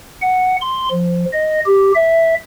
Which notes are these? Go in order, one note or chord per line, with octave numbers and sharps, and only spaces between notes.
F#5
C6
F3
D#5
G4
E5